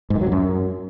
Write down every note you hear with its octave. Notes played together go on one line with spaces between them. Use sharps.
G#2
D#3
F#3
F2
F#2